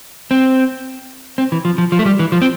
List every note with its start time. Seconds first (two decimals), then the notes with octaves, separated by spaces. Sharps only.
0.31 C4
1.38 C4
1.52 E3
1.65 F3
1.78 F3
1.92 F3
1.99 A3
2.05 G3
2.19 E3
2.32 F3
2.42 C4